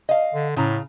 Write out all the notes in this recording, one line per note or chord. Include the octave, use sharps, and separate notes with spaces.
D#5 F5
D3
A2 C#3 A#5